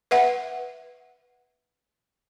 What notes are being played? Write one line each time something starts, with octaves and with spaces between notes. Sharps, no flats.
B4 E5 F#5